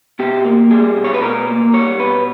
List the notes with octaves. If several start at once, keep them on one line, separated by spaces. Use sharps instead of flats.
B2 G4
A#3
G3 G#4
B2
C#5
B4
B2 A#4
A#3
G3 C#5
B2 B4